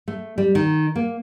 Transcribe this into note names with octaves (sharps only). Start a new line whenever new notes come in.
A3
G3
D#3
A#3